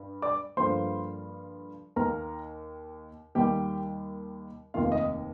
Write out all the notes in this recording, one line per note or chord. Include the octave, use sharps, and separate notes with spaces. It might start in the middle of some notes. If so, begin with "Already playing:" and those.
Already playing: G2
D5 D6
G2 D3 F3 A#3 C5 C6
D#2 D#3 A#3 A#4 A#5
D#2 D#3 G3 A#3 G4 G5
F1 D#2 D#3 A#3 F4 F5
D#4 D#5